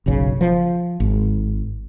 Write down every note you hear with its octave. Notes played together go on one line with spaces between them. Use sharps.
F#1 B1 C#3
F3
G#1